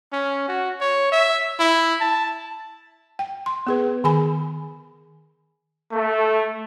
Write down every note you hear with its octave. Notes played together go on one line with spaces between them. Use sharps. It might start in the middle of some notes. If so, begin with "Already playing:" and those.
C#4
F#4
C#5
E5
E4
A5
G5
C6
B3 G#4 B4
D#3 G#4 G#5 B5
A3